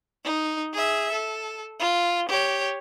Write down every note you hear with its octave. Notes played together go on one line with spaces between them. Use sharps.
D#4
G#4 E5
A4
F4
G4 C#5